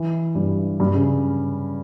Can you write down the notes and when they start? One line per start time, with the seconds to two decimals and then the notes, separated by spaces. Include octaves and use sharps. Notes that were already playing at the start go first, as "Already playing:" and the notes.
Already playing: E3
0.35 G2
0.80 G2
0.94 C#3